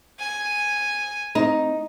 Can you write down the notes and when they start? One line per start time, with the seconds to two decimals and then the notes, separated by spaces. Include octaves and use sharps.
0.19 G#5
1.35 A3 C4 D#4